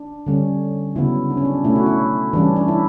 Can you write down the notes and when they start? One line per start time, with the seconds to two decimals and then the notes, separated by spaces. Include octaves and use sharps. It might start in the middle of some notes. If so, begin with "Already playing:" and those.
Already playing: D4
0.26 D3 G3 C#4
0.96 C#3 F#3 B3 E4
1.30 D4
1.37 C#4
1.45 D4
1.64 B2 A3 C#4 E4
1.75 F#4
1.86 E4
2.33 E3 G3 C#4 D4
2.56 D4
2.68 E4